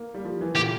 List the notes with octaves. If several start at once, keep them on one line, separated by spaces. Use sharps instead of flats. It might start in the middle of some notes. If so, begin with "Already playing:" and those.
Already playing: A#3
G3
F3
E3
A#2 G4